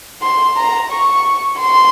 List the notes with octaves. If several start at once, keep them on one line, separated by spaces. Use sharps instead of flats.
C6
A#5
C#6
C6